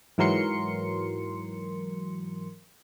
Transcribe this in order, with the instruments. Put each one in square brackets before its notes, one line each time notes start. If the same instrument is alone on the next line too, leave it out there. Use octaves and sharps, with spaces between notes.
[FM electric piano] G#2 E3 F#3 A#4 C6 C#7